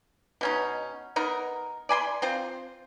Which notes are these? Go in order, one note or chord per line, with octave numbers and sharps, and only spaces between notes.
B2 C#4 D#4
B3 D#4 A#4
D5 G#5 B5 C6
C4 F4 C5